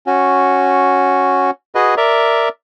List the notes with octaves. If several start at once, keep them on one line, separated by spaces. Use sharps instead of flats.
C#4 F#4
F#4 G#4 B4 D#5
A#4 D5 E5